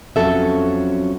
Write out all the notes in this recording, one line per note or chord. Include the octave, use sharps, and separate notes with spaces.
F2 D#3 F#3 C#4 A4 E5